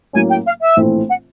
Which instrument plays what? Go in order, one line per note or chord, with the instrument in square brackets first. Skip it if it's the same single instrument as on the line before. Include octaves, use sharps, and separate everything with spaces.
[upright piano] A2 F#3 A#3 C#4 [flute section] G#5
[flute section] G5
F5
E5
[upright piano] A#1 A2 E3 A3 C4
[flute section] F#5